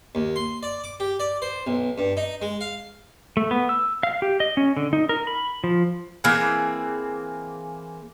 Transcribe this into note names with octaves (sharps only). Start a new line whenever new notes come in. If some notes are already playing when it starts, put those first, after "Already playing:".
D#2
C6
D5
D6
G4
D5
C5
B1
G2
D#4
G#3
F5
A3
B3
E6
F5
G4
D#5
C#4
D3
D#4
A#4
B5
F3
E3 A#3 C4 G#4